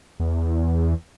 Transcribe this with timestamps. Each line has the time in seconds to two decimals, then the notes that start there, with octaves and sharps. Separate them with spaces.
0.20 E2